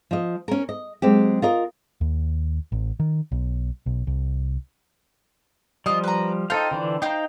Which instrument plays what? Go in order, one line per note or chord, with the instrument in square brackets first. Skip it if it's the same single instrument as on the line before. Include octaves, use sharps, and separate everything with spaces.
[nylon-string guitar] F3 D#5
C#4 A#4
D#5
F#3 G#3 C4 G4
F4 A#4 D#5
[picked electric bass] D#2
A1
D#3
B1
B1
C2
[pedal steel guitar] F3 G3 [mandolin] F4 D#5
[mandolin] B4 A#5
[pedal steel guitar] D#4 A4 F5 [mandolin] F4 C5 G5
[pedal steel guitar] D3 E3 D4
[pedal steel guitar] D#4 A#5 [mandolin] C5 F5 G5